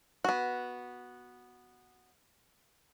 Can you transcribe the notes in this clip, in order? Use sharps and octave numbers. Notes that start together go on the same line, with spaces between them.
B3 F#4